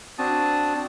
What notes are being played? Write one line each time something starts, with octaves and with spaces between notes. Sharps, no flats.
C4 D4 F#4 A5 D#6